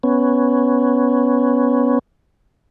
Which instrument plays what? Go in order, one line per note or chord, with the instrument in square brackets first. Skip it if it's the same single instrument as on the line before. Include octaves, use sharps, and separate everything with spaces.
[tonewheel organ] B3 C#4